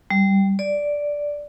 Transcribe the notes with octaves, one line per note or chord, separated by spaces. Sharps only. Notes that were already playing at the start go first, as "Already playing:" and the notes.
G3
D5